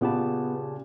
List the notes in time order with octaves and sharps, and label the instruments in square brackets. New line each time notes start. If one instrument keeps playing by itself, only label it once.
[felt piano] A#2 [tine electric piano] C#3 G4 A5 [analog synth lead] B3